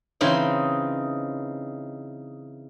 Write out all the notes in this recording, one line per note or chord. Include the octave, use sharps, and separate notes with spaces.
C#3 E3 C4 D#4